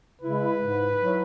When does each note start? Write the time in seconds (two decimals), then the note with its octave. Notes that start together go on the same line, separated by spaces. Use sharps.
0.22 C#3 G#3 E4 B4
0.59 G#2
0.97 F#3 E4